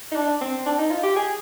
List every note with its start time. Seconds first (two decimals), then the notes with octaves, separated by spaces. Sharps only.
0.12 D#4
0.16 D4
0.41 C4
0.66 D4
0.78 D#4
0.91 F4
1.03 G4
1.16 G#4